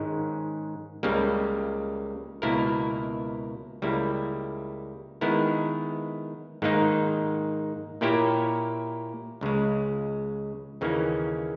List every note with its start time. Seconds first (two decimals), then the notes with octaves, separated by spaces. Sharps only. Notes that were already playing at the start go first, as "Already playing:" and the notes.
Already playing: G#2 D#3 G#3 C#4
1.03 C#2 C#3 G3 A#3
2.42 C#2 B2 A#3 E4 A#4
3.82 C#2 C#3 G3 A#3 E4
5.21 D#3 G#3 B3 E4 A#4
6.62 G#2 D#3 A#3 D#4
8.01 A#2 A#3 E4 G4 C#5
9.41 C#2 C#3 G#3
10.81 D#2 C#3 E3 A#3 C#4